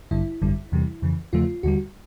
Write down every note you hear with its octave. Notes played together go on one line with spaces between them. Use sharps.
A1 G2 D3 G3 E4
G#1 F#2 D3 G3
E2 C3 E3 G3
F2 C#3 E3
E2 C#3 F3 A3 F4
D#2 D3 G3 F#4